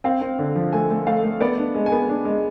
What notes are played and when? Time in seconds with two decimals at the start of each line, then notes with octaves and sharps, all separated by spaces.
0.04 C4 F5
0.21 C4
0.39 D3
0.56 F3
0.72 A3 G#5
0.90 A3
1.07 A3 F5
1.24 A3
1.41 B3 D5
1.58 D4
1.75 G#3
1.86 G#5
1.92 B3
2.09 D4
2.25 G#3